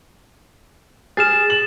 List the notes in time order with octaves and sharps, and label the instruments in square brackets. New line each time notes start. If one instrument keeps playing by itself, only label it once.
[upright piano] G#4 F6 [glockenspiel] A6 E7
[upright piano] F#7